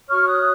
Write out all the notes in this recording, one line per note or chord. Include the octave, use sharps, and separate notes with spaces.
F#4 C#5 C#6 F6
D#6 F#6